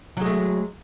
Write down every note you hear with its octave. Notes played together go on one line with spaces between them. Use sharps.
F#3 G#3 A3